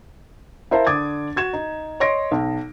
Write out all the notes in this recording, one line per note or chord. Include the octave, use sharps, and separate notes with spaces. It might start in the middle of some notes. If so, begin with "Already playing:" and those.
E4 A#4 C5 E5 F5 A5
D3 D6 D#6 G#6 A6
F#4 G#6 E7
D#4
C#5 D#5 C6 A#6 D7
B1